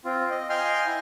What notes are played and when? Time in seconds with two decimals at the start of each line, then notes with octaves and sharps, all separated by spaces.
0.05 C4 F4
0.30 D#5
0.50 D#5 F5 G5 G#5 C6 F6
0.86 E4